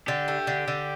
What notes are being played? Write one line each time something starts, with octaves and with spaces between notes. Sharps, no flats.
D3 G4
A3
D3
D3